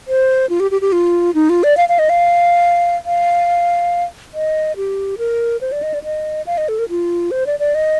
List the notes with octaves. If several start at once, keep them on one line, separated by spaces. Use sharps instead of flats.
C5
F4
G4
G4
G4
F4
D#4
F4
D5
F5
F5
D#5
F5
F5
D#5
G4
A#4
C5
D5
D#5
D5
D#5
F5
D#5
A4
A#4
F4
C5
D5
D5
D#5